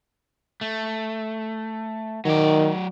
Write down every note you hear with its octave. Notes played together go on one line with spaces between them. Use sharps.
A3
D#3 F#3 D5